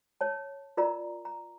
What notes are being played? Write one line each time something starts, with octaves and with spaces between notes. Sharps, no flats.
C#5 A5
F4 A#4 D5 A#5
A#5